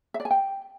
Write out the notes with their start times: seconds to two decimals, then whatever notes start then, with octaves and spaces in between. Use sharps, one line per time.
0.14 E5
0.20 D5
0.25 G#5
0.31 G5